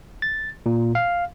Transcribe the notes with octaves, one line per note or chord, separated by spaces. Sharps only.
A6
A#2
F5